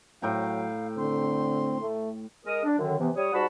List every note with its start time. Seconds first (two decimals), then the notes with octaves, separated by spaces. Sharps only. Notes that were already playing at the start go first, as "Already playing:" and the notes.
0.22 A2 F#3 F5 G5 A#5
0.97 D3 C4 C6
1.81 A3
2.45 G#3 A#4 D#6
2.64 D4
2.79 F#2 D3 D#3
2.99 C3 E3 B3
3.16 G3 C#5 D#6
3.33 G#2 G3 F#4 F#5 A5 B5